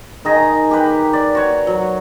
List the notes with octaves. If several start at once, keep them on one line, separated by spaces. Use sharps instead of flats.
D#3 G#4 A#5
G4 B4
D5
F#4 C#5
F#3